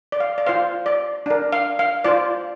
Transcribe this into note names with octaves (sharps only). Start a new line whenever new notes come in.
D5
F5
D5
F4 C5 F5
D5
D4 A#4
F5
F5
F4 C5 D5